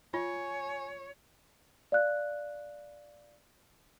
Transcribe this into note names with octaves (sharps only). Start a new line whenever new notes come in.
F4 C#5 G#5
D5 F5 F#6